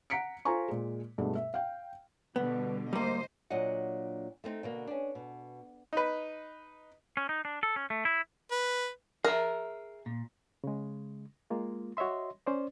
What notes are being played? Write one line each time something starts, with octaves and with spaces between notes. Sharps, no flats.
F#5 A#5 B6 C#7 D7
F4 A4 C5 G#5 A#5 C#6
A#2 G#3
G2 B2 G#3 A3 D4
E5
F5 G5
B2 D3 G3 B3
D2 G3 A#3 C5 D#5
A#2 F#3 D4 D#5 F#5
A3 B3 C4 D#4
B2 D3 A#3
C#4 D4
B2
D#4 B4
C#4
D#4
D4
A4
C#4
A3
E4
B4
G#4 A#4 E5
A#2
C#3 G#3
G#3 A#3 F4
F#4 C#5 D#5 E5 C6
C#4 C5 D5